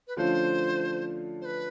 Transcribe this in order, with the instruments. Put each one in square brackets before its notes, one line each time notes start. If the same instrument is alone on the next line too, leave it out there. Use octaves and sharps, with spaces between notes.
[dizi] B4
[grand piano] D3 F3 A3 C#4 F4 [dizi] C5
[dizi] C5
B4